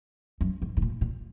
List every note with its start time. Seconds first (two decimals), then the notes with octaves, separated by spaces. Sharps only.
0.41 F#2
0.62 G#2
0.77 G#2
0.82 A#2
1.01 A#2